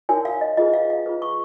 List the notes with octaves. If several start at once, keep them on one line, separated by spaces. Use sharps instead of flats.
D#4 F#4 A#4 C#5 G#5
F5
D#5
F4 G#4 B4 D#5
F5
F5
F4 G#4 B4
C#6